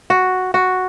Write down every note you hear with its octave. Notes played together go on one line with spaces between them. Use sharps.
F#4
F#4